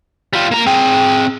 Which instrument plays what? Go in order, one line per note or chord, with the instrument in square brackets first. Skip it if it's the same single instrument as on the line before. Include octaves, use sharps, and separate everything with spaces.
[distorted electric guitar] G3 F4
A#3 A#5
[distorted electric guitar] C4 G#4 [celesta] G5